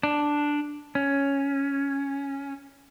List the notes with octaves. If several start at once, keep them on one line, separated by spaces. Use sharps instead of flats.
D4
C#4